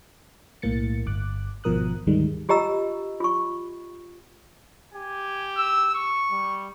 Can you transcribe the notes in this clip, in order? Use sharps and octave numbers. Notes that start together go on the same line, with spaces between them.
B1 A2 A#3 A6 C#7
G1 D6 F#6
G#1 B2 F3 A#4 D#6 F#6
D2 G#2 D#3 G3 G#3
F4 G4 D#5 A#5 E6
F4 C#6
G4 G#5
E6
C#6
G3